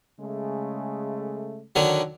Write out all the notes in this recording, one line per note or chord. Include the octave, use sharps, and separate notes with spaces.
C#3 G#3 A3
D3 D#3 F#3